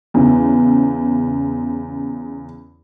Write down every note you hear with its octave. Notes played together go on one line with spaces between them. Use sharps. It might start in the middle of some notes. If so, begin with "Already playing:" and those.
E2 C#3